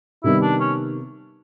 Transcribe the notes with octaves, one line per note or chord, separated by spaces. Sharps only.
C3 D#3 G3 B3 E4
D4
C#4